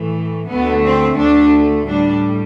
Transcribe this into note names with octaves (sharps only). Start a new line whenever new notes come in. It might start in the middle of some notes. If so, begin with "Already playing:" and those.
Already playing: A2 E3 A3
D2 D3 A3 B3
C4
D2 D3 A3 D4
A2 G3 D4